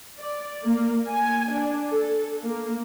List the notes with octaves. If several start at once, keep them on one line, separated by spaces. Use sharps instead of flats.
D5
A#3
G#5
D4
A4
A#3